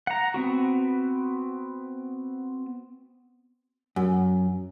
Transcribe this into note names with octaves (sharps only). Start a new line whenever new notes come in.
F#5 A#5
B3 C4 F#4
F#2